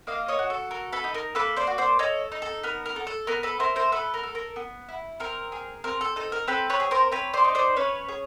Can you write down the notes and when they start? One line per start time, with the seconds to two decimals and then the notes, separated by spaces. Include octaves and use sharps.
0.07 A#3 D#5 F5
0.28 C#5 D#5
0.39 F#4
0.50 A4
0.71 A4 A#4
0.93 A4 B4
1.04 D#4
1.14 A#4
1.35 A#3 A4 B4
1.57 C5 D5
1.67 F#4
1.78 C5 D5
1.99 A4 C#5 D#5
2.32 D#4
2.42 A4
2.63 B3 A#4
2.86 A#4
2.96 A4
3.07 A4
3.27 B3 A#4
3.43 A4 B4
3.59 E4 A#4 C5
3.76 A#4 C5
3.92 B3 A4 B4
4.14 A#4
4.23 A4
4.35 A#4
4.56 B3
4.89 E4
5.20 C4 A#4
5.52 G#4
5.84 C4 A#4
6.01 A4
6.16 D#4 A4
6.32 A#4
6.47 C4 A4 B4
6.70 B4 C#5
6.80 G#4
6.91 A#4 C5
7.12 C4 B4 C#5
7.34 C5 D5
7.44 D#4
7.55 C5 D5
7.76 C#4 B4 C#5
8.09 G#4